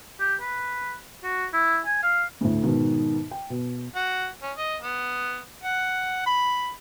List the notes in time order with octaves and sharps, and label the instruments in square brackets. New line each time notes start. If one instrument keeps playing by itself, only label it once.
[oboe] G4
B4
F#4
E4
G#5
F5
[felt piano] D2 A2
G#2 B2 D#3
G5
B2
[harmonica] F#4
C#4
D#5
B3
F#5
B5